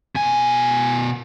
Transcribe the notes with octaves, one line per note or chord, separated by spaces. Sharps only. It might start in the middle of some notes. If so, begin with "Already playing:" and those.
B2 G#5